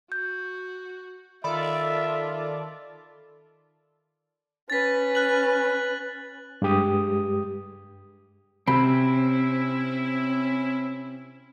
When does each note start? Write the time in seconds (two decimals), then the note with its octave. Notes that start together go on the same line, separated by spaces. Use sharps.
0.12 F#4 G6
1.44 D#3 F4 A4 D5 E5 B5
4.70 C#4 B4 A6 B6
5.15 F#6 F#7
6.62 G2 G#3 G4 D#6
8.67 C3 C4 C#4 E4 B5 E6